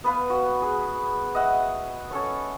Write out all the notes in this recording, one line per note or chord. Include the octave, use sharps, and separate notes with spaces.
B3 B4 F5
F#4
G#4
D#5 E5 F#5
C#4 A4 C#5